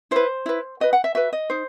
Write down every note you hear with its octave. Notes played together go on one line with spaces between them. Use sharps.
E4 B4 C5
E4 B4
F#4 B4 D#5
F#5
E5
F#4 B4 E5
D#5
D#4 C5